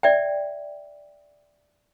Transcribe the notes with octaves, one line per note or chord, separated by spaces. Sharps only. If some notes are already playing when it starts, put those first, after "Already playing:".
D5 E5 G5